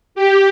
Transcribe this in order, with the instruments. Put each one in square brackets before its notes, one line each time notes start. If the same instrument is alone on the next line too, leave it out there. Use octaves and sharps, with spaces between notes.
[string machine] G4